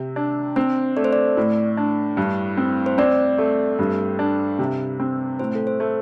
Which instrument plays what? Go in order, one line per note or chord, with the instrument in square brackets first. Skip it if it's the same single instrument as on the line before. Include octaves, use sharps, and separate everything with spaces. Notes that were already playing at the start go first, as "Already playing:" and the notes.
Already playing: [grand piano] C3 C4
D4
[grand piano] C4 [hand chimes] C5
[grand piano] A3 [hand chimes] D5
[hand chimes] C5
D5
[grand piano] A2
D4
G2
C4
[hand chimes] C5
[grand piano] C4 [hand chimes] D5
[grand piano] A3
G2
D4
C3
C4
[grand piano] A2 [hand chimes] C5
[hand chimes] A4
C5
[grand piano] A3